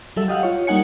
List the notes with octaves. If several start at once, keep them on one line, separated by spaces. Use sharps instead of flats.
F#3 G3 A4 E5
G4 D#5 F5 F#5
F4 C#5
G3 A#3 D#4 F#5 G#5 C#7